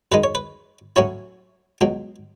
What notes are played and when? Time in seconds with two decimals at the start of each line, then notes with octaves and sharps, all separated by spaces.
0.12 F#2 D#3 G#3 D#4 B4
0.24 C#5
0.35 B4
0.96 A2 F#3 C#4 E4 C#5
1.81 C#2 B2 F#3